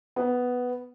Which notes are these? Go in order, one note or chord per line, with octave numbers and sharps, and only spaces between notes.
B3